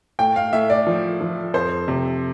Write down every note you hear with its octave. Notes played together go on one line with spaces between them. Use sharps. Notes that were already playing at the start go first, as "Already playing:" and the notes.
A2 G5
F5
A2 E5
D5
F3
F3
F2 C5
C3